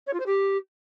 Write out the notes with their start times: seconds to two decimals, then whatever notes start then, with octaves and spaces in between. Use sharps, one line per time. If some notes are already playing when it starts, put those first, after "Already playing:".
0.07 C#5
0.13 F4
0.20 C5
0.26 G4